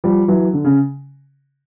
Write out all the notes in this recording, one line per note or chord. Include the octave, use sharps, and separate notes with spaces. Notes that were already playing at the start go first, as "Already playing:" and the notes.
F3 G3
E3 F#3
D3
C#3